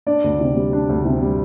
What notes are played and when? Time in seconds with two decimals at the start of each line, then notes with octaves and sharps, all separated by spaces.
0.06 D4 D5
0.24 D2
0.39 C3
0.56 G3
0.73 D4
0.89 D2
1.05 C3
1.22 G3